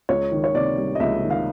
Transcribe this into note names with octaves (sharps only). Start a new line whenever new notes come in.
C#2 C#5
D#3
C#5
C3 D5
G3
D#5
C#2 E5
D#3
F5